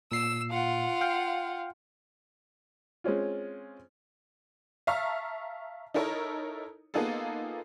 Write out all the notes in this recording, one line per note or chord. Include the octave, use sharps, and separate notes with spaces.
A#2 E6 C7
F4 F#5
F5 G5 F6
G#3 C4 C#4 F4
E5 F5 A5 A#5 C#6 F6
D#4 E4 A4 A#4 C#5
A#3 B3 D#4 F4 G#4 A4